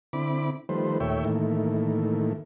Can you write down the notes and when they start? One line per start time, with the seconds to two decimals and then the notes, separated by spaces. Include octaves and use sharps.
0.13 D3 C4 E4 B5 D6
0.69 D#3 F3 G3 A3 B4 C5
1.00 D#2 A#2 A3 C#5 E5 G5
1.25 A2 D#3 E3 A3 A#3